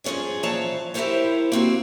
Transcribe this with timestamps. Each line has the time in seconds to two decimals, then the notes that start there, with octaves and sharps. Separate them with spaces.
0.04 G2 F3 C#4 G#4 C#5
0.43 A#2 E3 F3 C#5 F5 A5
0.94 E4 G4 A4 A#4 C5 C#5
1.52 A#3 C4 F#4